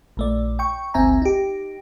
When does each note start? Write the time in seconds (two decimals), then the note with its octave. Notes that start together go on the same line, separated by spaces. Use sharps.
0.17 A#1 A3 D5
0.59 G5 C#6
0.94 G1 C#2 C4 E5 G#5 A#5
1.22 D#4 G4